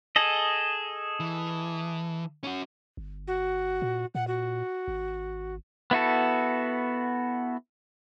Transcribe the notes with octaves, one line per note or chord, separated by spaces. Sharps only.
G#4 A4 D#5
E3
C#4 F#4
G1
F#4
A#2
A#2 F#5
F#4
G#1
B3 E4 F#4 A4